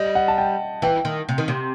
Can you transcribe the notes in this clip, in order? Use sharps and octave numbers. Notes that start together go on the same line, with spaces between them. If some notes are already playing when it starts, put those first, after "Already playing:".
Already playing: G3 D#5
F#5
A5
G5
E3 G5
D#3
C3
D#3
C3